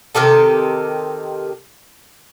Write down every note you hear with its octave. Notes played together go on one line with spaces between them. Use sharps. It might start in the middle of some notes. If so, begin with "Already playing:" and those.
C3 D#3 G4 A4